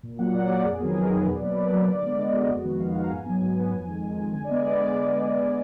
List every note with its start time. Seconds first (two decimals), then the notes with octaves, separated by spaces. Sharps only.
0.03 A#2
0.19 F#3 A#3 F#5
0.34 A#2 D5
0.49 F#3 A#3 F#4
0.64 F2 G#4
0.80 D#3 F#3 B3 A#4
0.95 F2 G#4
1.11 D#3 F#3 B3 A#4
1.26 B2 B4
1.35 D5
1.42 F#3 A#3 B4
1.57 B2
1.72 F#3 A#3
1.88 D3 D5
2.03 G#3 B3
2.18 D3 D#5
2.34 G#3 B3 F#4
2.49 F2 F#4
2.64 D#3 G#3 B3
2.79 F2 F5
2.95 D#3 G#3 B3 F#5
3.04 A#5
3.10 G#2 G#5
3.26 F#3 B3
3.41 G#2
3.57 F#3 B3
3.72 F2
3.87 D#3 G#3
4.02 F2
4.18 D#3 G#3
4.33 D3 G#5
4.44 D5
4.49 G#3 B3 D#5
4.64 D3 D5
4.80 G#3